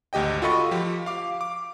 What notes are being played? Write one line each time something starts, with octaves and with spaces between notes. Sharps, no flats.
G#1 D2 G4 D#5 G5
F4 F#4 A4 D#5 B5 C#6
F3 G4
F5 D6
D6